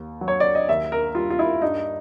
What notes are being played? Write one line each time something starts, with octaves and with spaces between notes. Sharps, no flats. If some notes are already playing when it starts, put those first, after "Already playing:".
Already playing: D#2
F#3
C#5
D5
D#5
D#2 E5
A#4
G3 F4
F4
E4
G2 D#4